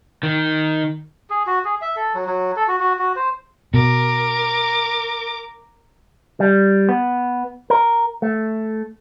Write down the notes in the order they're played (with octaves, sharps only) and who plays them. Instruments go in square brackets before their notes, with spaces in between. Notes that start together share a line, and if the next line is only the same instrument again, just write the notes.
[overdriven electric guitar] D#3
[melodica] G#4
F#4
G#4
E5
A4
F#3
F#3
A4
F#4
F#4
F#4
C5
[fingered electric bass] B2 [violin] A#4 D6
[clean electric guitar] G3
B3
A#4
A3